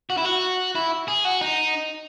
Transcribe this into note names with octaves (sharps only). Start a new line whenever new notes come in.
F#4
E4
F#4
E4
G#4
F#4
D#4